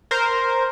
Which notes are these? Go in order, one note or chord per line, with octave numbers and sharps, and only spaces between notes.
A#4 C5